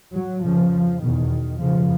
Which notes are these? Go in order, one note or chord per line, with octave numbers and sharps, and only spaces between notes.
F#3
F2 C#3 F3
E2 B2 D#3
F#2 C#3 F3